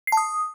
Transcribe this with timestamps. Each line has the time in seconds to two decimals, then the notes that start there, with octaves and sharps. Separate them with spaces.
0.07 C7
0.12 A5
0.17 D#6